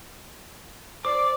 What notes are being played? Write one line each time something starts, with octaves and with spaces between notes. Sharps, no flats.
C5 D5 D6